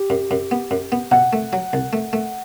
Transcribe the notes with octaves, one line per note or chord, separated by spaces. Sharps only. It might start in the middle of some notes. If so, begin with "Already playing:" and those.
Already playing: G4
F#2
F#2
B3
F#2
B3
B2 F#5
A3
F#3
C2
A3
A3